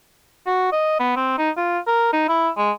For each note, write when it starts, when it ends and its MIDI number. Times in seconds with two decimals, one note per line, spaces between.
0.47 0.70 66
0.72 0.99 75
1.00 1.13 59
1.16 1.36 60
1.38 1.50 63
1.57 1.79 65
1.87 2.09 70
2.13 2.27 63
2.29 2.49 64
2.58 2.71 56